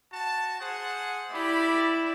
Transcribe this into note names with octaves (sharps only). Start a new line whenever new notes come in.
F#4 A5
G#4 C5 F#5
E4 G4 D5 B5